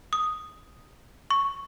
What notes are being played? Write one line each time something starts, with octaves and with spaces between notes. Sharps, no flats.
D#6
C#6